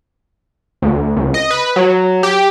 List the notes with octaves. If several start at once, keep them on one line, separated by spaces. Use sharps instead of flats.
D2
C#2
D#5
B4
F#3
G4